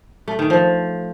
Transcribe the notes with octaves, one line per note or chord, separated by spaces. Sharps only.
A3
D#3
F3